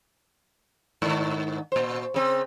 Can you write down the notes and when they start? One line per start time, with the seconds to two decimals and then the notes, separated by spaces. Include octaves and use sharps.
1.02 G#2 D#3
1.72 A#2 C5
2.14 C#3 C4